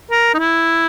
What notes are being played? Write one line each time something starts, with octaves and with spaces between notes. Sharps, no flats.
A#4
D#4
E4